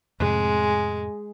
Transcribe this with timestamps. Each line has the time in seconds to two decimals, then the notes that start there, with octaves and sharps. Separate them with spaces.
0.20 F2 A2 C3 G#3